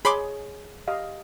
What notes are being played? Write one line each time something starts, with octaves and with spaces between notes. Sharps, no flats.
G#4 C#5 B5 C6 D6
G4 D#5 F5